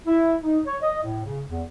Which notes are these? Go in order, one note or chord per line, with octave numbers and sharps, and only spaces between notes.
E4
D#4
C#5
D#5
A2
C#3
E2